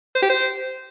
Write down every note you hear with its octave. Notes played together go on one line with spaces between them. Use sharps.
C5
G4
C5